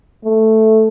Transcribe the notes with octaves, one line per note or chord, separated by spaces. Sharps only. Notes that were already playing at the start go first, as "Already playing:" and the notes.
A3